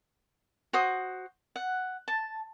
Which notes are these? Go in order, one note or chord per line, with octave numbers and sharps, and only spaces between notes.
F#4 C5 D#6
F#5
A5